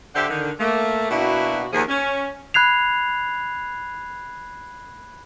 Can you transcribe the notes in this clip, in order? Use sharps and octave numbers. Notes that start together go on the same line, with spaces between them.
D3 G4 C5 D5 E5 F#5
D3 D#3
A3 A#3
B2 A#3 D4 E4 F#4
D#2 F3 G#4
C#4
B5 F#6 G#6 C7 F7